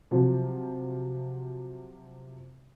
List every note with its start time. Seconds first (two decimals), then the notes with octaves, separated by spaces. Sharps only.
0.11 C3 F3 F#3